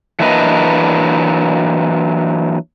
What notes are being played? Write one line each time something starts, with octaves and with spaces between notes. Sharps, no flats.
E3 F#3 A#3 D4 B4 D#5